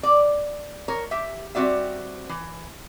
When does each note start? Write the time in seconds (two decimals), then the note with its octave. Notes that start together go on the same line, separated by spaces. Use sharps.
0.03 D5
0.88 A#4 C#5
1.11 G4 E5
1.55 G3 C4 F#4 D5 E5
2.29 E3